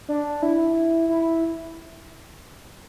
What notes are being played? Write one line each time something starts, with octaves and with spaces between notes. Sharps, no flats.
D4
E4
E4